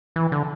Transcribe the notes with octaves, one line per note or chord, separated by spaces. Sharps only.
E3
D3